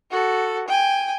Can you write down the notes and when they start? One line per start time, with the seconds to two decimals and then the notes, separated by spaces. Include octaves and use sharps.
0.11 F#4 A4
0.69 G5 G#5